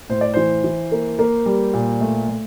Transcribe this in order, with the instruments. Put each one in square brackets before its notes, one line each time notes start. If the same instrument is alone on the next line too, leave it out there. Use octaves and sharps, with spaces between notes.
[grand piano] A2 C5
D5
E3 C5
E3
A#3
A#3
G3
A#2
A3
A3